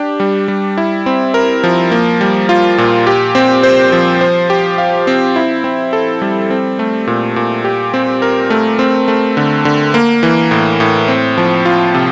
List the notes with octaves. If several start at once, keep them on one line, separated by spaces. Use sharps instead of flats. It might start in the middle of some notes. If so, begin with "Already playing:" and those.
Already playing: D4 G4
G3
G3
E4
C4
A#4
F3
A#3
G3
F4
A#2
G4
C4
C5
F3
C5
G4
F5
C4
E4
C4
A4
G3
C4
A3
A#2
A#2
G4
C4
A#4
A3
C4
A3
D3
D3
A#3
E3
A2
A2
C4
F3
F4
C3